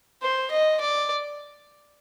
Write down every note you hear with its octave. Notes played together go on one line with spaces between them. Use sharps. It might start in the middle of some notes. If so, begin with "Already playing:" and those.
C5
D#5
D5